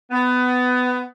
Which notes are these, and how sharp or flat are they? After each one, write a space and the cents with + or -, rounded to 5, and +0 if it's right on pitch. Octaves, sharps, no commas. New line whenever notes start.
B3 +20